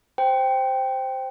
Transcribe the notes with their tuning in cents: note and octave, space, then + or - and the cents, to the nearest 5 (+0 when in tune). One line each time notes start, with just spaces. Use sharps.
C5 +0 G5 +0